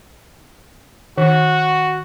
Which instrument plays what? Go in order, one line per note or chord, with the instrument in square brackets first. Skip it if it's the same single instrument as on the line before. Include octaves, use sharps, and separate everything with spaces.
[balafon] D#3 [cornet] F#4